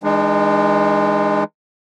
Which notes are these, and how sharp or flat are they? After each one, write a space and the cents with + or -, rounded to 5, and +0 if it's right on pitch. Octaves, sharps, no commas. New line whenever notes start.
E3 -35 G#3 -10 D4 +40